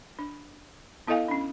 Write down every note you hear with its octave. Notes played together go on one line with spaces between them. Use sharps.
D4
B3 E4 A4 D#5 F5 G#5
C#4 D4